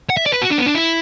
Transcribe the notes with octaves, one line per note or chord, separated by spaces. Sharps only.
F#5
E5
D5
B4
F#4
D4
B3
D4
E4